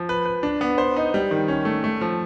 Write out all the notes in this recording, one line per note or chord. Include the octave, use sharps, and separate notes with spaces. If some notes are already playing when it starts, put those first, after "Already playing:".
Already playing: F3
B4
B4
D4
B3
C5
D#4
G3
D#3
C#4
A3
A3
F3